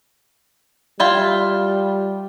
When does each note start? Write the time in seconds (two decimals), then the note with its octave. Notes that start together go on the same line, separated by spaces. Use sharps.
1.00 G3 E4 F4 G5